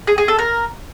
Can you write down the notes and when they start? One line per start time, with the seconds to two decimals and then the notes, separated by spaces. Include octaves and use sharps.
0.07 G#4
0.18 G#4
0.28 A4
0.39 A#4